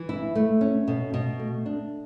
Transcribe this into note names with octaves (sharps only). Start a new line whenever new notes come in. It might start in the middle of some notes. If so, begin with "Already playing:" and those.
Already playing: E3
E4
A3
C#4
B2
B2
A3
D4